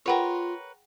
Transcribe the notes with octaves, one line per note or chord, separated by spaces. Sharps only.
F4 G#4 A#4 B4 C#5 F#5 G5